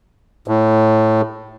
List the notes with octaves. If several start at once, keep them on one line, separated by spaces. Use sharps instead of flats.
A2